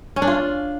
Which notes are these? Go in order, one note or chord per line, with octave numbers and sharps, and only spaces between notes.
C#4
D4
F4